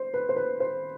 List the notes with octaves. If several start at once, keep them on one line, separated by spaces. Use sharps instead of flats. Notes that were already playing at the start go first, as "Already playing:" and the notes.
Already playing: C5
B4
C5
B4
C5